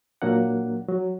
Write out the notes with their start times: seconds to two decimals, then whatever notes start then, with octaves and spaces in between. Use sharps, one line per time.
0.22 A#2 F#3 A#3 D4 F#5
0.89 F#3